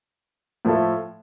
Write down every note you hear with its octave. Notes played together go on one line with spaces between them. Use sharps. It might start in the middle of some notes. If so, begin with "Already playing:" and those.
A2 F3 A3 E4 A4